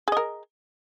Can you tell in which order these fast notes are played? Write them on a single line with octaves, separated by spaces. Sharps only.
G#4 D#5 A#4